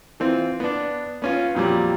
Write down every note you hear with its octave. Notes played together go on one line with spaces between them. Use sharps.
E3 C4 F4
B3 D4
B3 C#4 F4
F2 A#2 F#3 G3